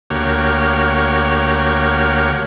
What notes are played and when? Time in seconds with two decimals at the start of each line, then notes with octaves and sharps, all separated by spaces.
0.10 D2 A#3 F#4 G4 C#5 F6